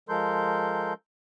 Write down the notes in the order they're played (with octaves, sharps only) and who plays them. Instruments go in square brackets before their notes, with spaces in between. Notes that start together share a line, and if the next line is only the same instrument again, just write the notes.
[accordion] F3 G#3 A4 A#4 C6 G6